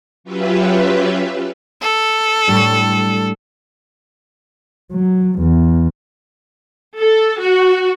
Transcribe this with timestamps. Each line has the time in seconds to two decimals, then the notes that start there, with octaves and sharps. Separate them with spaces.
0.24 F#3 C#4 F4 G4 B4 E5
1.83 A4
2.47 A2 G3 D4
4.93 F#3
5.39 E2
6.99 A4
7.41 F#4